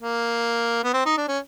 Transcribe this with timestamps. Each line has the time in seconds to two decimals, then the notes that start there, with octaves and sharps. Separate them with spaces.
0.01 A#3
0.84 B3
0.93 C4
1.06 D#4
1.17 D4
1.28 C#4